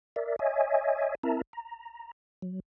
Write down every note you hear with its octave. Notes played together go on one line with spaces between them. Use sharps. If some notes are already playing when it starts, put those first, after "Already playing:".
A#4 D5 E5
C#5 D#5 E5 G#5
C4 E4 A#4 E5 A5 A#5
A#5
F#3